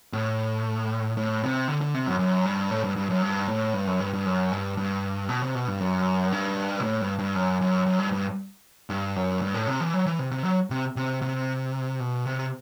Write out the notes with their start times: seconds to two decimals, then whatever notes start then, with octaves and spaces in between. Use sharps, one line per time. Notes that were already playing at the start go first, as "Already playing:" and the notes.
0.13 A2
1.17 A2
1.43 C3
1.68 D3
1.81 D3
1.94 C3
2.07 F#2
2.19 F#2
2.45 G2
2.71 A2
2.84 G2
2.96 G2
3.10 F#2
3.22 G2
3.48 A2
3.74 G2
3.87 F#2
4.00 G2
4.13 G2
4.26 F#2
4.52 G2
4.77 G2
5.29 B2
5.42 C3
5.55 B2
5.68 G2
5.80 F#2
6.32 G2
6.80 B2
6.83 A2
7.01 G2
7.19 G2
7.35 F#2
7.61 F#2
7.87 F#2
7.99 G2
8.12 G2
8.90 G2
9.16 F#2
9.42 G2
9.54 A2
9.67 C3
9.80 E3
9.94 F#3
10.06 E3
10.19 C3
10.31 C3
10.44 F#3
10.70 C3
10.96 C3
11.22 C3
12.00 B2
12.25 C3